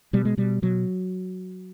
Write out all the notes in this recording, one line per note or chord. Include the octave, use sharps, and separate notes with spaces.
B2 G3
G#3
B2 G3
B2 F#3